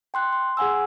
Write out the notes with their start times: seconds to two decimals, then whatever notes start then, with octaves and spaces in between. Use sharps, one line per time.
0.14 G5 C6 F#6
0.33 C6
0.57 G#4 F#5 G#5 E6